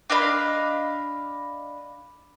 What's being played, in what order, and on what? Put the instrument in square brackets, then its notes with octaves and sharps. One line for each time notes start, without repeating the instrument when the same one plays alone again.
[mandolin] D4 D#5 F5 B5